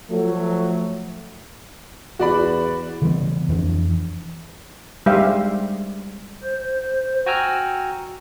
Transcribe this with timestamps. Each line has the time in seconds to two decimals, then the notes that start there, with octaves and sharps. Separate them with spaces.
0.10 F3 F#3 A3
2.19 E2 F#4 D5 B5
3.02 C#3 E3 G3 B3
3.49 F2 E3 F3 D4
5.06 G3 G#3 G4 C5 E5 F5
6.43 C5
7.26 F#4 G5 G#5 A#5 E6 F6